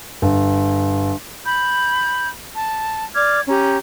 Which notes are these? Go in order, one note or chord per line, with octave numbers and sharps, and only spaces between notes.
G1
B5 G6
A5
D5 D6 F6 G#6
C#4 G4 A#5